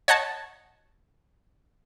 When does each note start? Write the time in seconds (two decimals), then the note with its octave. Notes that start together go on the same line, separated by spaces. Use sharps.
0.08 C#5 D#5 F#5 A5 G#6